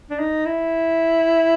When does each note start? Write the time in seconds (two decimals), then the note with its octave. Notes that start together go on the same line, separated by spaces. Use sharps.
0.10 D4
0.19 D#4
0.45 E4